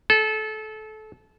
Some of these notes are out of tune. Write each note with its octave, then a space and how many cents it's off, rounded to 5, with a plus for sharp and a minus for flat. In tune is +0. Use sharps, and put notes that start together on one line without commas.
A4 -25